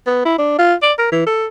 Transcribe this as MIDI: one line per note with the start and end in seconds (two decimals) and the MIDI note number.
0.07 0.22 59
0.25 0.34 64
0.38 0.53 62
0.59 0.74 65
0.82 0.93 74
0.98 1.07 70
1.12 1.24 52
1.26 1.47 69